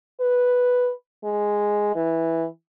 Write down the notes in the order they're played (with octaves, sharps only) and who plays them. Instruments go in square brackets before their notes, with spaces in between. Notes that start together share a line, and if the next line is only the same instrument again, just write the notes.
[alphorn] B4
G#3
E3